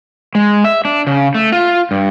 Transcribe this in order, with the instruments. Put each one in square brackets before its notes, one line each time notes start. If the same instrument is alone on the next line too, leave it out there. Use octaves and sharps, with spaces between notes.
[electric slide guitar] G#3
E5
D4
C#3
A3
F4
G2